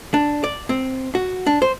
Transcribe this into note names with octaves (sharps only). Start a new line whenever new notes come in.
D4
D5
C4
F#4
D4
C5